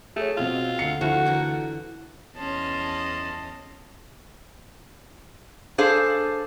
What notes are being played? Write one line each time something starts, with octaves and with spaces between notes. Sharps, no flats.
A3 G#4 C#5
B2 C4 F4
D2 C7 C#7
D2 F3 A3 E4 F#4
D3 E3 A#4
E2 C#4 D#5 A5 C6
D4 G#4 A4 C5 F5